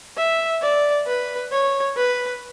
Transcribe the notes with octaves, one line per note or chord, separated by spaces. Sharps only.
E5
D5
B4
C#5
B4